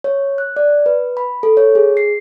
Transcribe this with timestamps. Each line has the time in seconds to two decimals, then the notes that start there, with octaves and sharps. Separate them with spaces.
0.04 C#5
0.38 F#6
0.56 D5
0.86 B4
1.17 B5
1.43 A4
1.57 C#5
1.75 G#4
1.97 C7